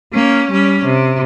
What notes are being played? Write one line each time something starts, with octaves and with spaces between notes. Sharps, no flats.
A#3 C#4
G3 C#4
C3